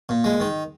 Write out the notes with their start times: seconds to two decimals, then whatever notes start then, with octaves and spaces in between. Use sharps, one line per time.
0.09 A#2
0.24 G#3
0.40 D#3